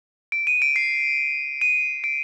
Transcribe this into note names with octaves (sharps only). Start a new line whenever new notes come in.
D7
D#7
D7
C7
D#7
D7